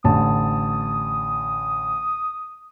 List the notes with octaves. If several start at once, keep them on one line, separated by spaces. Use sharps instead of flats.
A1 D3 A5 D#6